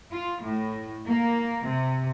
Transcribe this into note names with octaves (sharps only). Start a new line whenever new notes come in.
F4
A2
A#3
C3